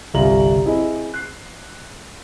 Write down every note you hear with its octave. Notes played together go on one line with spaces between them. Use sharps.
G1 C2 F4 A#5 F#7
C4 E4 G#4 D#5
F#6 C7